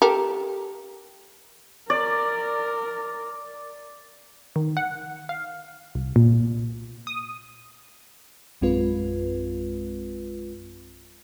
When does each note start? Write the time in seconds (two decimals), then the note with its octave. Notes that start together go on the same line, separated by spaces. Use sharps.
0.02 G4 A4 A#4
1.90 A#4 D5
4.56 D#3
4.77 F#5
5.29 F5
5.95 C2
6.16 A#2
7.07 D#6
8.61 A#1 F#2 G#3 C4 F4 B4